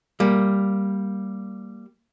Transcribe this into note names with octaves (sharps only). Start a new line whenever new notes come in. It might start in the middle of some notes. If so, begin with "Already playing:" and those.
G3 A#3